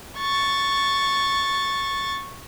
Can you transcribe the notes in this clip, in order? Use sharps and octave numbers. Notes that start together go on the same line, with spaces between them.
C#6 A6